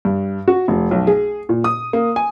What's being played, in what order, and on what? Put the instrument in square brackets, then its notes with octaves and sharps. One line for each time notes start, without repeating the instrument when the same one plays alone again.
[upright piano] G2
F#4
F1
B1
G#4
A#2
D#6
A#3
G#5